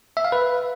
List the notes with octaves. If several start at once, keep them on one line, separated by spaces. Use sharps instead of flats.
E5
F5
B4